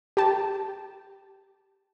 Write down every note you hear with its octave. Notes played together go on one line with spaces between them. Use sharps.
G4 G5 A5